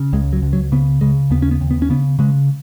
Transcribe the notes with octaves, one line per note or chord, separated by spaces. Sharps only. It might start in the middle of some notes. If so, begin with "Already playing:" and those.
Already playing: C#3
C#2 G#3
F#3
C#2
F#3
C#3 B3
C#3 G#3
D#2 B3
C#4
B3
D#2
B3
C#4
C#3 B3
C#3 G#3